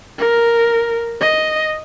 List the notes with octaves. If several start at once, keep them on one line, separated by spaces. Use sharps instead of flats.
A#4
D#5